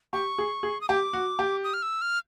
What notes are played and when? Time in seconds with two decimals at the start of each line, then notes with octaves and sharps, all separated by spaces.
0.13 G4 C#6
0.38 G#4
0.63 G#4
0.81 D#6
0.89 G4 D6
1.13 F#4
1.39 G4
1.64 D#6
1.74 F6
1.82 E6
2.02 F6